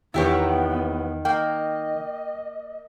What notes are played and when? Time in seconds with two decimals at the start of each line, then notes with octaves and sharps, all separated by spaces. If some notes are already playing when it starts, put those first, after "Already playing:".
0.14 E2 D#3 B3 E4 G4 C#5
1.25 A#3 D#5 G5